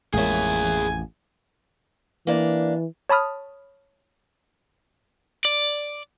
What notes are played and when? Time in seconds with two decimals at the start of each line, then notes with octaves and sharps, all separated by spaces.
0.13 A1 F2 G#3 A#3 G#4 C#5 E5 G#5
2.27 E3 A#3 D4
3.09 C#5 A5 B5 D#6 F6
5.45 D5